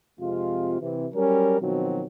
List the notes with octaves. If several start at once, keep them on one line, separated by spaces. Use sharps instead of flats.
F2 C3 G#3 F4
C3 E3
F#3 G3 C#4 A#4
B2 D#3 F3 F#3 C4